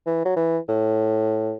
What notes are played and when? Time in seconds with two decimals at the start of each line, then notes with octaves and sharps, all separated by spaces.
0.06 E3
0.25 F#3
0.36 E3
0.68 A2